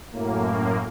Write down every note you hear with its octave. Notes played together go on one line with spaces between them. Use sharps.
F#2 A2 A#3